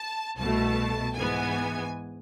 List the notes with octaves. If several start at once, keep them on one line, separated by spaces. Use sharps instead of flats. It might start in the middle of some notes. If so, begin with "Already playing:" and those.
Already playing: A5
C2 B2 A3 A5
G#2 E3 B3 G#5